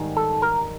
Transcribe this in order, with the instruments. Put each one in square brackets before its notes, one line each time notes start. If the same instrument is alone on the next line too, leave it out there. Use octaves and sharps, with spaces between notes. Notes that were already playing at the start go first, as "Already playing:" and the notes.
Already playing: [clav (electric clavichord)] G#2 D#3 G3
A4
A#4